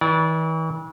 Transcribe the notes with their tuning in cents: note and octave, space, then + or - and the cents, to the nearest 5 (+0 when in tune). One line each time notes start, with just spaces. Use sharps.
E3 -40 D5 -25